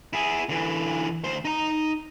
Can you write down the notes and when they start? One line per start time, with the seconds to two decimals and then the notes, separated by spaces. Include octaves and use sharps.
0.13 E4 G#4
0.49 D3 E3
1.24 D2 C5
1.45 D#4 A#5